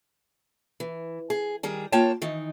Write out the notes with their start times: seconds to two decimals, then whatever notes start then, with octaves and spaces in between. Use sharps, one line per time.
0.80 E3
1.30 G#4
1.63 D#3 G3 G#4
1.92 A#3 F4 C#5 G5 A5
2.22 D#3 E3 D#4